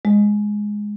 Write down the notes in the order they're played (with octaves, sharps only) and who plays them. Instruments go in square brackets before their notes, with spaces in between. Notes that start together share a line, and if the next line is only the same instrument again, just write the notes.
[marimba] G#3